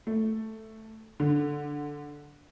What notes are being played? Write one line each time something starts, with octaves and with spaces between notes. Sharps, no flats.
A3
D3